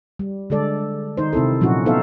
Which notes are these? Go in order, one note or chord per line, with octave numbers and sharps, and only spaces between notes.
G3
D3 G#3 A4 D5
D#3 D#4 C5
C3 C4 E4 A4
A#2 F3 F#3 C#4 D#4 F#4
B3 D#4 A4 C5 E5 F5